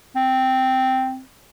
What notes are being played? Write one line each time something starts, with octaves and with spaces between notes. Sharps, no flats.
C4